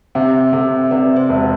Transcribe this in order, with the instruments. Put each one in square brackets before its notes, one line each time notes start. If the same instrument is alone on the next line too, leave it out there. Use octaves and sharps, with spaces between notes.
[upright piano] C3 [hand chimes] C5 E5
[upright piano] C3 [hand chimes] A4 C5
[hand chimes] E5
[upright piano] C3 [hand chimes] B4 D5
[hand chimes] C5 E5
[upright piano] E1